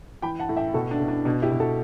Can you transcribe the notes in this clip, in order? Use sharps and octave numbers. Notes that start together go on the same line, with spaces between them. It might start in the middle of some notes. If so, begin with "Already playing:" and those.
E3 G5 B5
F#5 A5
A2
E5 G5
B2 F#4 A4
D4 F#4
B2
D4
B2 D4
E4 G4
B2
F#4 A4